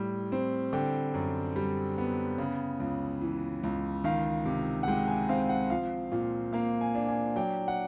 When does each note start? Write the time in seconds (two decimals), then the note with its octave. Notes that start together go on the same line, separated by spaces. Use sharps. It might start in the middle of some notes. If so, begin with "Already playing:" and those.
Already playing: A2 G3
0.32 C4
0.73 D3 G5
1.14 F#2
1.56 G3
1.98 B3
2.38 C#3
2.80 C#2
3.21 E3
3.63 C#2
4.04 D#3 F5
4.45 C3
4.83 F#5
4.88 G#3 G5
5.07 G#5
5.29 C4 F5
5.49 F#5
5.70 F3 F5
6.12 A#2
6.53 A#3 F5
6.81 G#5
6.95 D4
7.08 G#5
7.36 F#3 G5
7.68 F#5